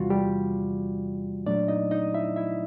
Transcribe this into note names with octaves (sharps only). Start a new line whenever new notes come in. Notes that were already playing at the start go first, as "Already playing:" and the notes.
Already playing: E2 C3 E3 G3 F4 F#4
G3 G4
A#2 F#3 A3 D4 D5
D#4 D#5
D#4 D#5
E4 E5
E4 E5